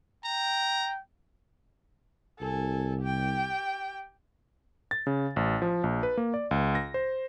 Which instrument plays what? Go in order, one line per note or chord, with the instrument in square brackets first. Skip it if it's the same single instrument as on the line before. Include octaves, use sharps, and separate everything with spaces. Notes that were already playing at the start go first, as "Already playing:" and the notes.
[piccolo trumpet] G5 [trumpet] A#5
[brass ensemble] C2 [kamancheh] A4 G#5
[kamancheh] G4 G5
[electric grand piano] A6
C#3
A1
F3
A#1
B4
A#3
D5
C#2
A#6
C5